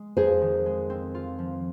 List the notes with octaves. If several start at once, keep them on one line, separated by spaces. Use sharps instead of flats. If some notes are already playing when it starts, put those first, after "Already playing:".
Already playing: G#3
F2 G#4 C5
D#3
G#3
C4
F4
F3